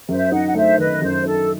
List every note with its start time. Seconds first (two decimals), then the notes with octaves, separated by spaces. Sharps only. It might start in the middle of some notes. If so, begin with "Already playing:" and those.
0.08 F#2 C5 E5
0.31 D#4 D#5 F#5
0.47 F#5
0.55 A3 C5 E5
0.78 D#3 B4 D#5
1.02 F#2 C5
1.25 D#4 A4